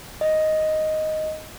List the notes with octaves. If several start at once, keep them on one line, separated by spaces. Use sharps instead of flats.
D#5